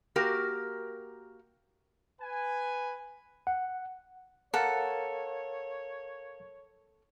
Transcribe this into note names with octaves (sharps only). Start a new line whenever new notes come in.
A#3 F#4 G4 A#4
B4 G#5
F#5
A4 A#4 C#5 F5 F#5 A6